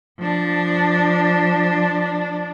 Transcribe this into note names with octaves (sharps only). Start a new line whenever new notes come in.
F3 D4